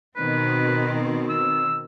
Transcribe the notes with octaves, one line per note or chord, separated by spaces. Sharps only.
B2 D#3 C4 B4
E6